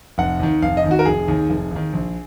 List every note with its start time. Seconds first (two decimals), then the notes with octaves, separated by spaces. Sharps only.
0.18 F1 F#5
0.40 D#2 D#3
0.62 F1 F5
0.77 D#5
0.84 D#2 D#3
0.91 F#4
0.99 A#4
1.05 F1 G#4
1.28 D#2 D#3
1.50 F1
1.71 D#2 D#3
1.93 A#1